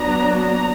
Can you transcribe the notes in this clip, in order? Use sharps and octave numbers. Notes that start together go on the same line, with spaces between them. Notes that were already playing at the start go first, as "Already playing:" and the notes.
Already playing: F#3 B3 D4 A#5
A#5